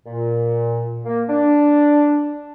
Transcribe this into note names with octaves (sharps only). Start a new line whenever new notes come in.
A#2
A#3
D4